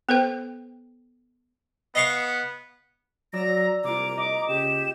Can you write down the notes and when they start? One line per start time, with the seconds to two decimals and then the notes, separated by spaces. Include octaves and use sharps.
0.09 B3 A4 B4 C5 G5
1.95 B3 D#5 F5 C#6
3.33 F#3 D5 A#5 E6 A#6
3.84 C2 A#3 F4 A#5 D6
4.18 D#5 D6
4.48 C#3 G4 E7